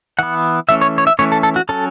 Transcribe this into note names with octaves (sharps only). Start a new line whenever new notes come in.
E3 B3 F#5
E3 A3 C#4 E5
C#5
C#5
E5
E3 A3 C#4 C#5
A4
A4
F#4
F#3 C#4 A4